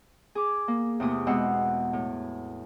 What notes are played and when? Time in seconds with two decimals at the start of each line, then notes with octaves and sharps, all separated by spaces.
0.35 G#4 D6
0.68 A#3
1.00 E2 C3 A3 G4 D#6
1.27 B2 G#3 C4 F#5 E6
1.93 A2